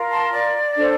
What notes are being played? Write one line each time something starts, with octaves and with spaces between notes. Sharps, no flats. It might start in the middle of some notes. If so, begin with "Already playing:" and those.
Already playing: F4 A#4
A5 C6
D5
D4 A4 C5